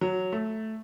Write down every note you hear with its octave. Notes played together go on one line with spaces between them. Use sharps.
F#3
A3